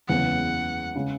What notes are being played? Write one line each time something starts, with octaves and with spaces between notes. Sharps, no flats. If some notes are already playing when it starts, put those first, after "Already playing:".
F#1 E2 C#3 G#3 B3 F#5
C#3 G#3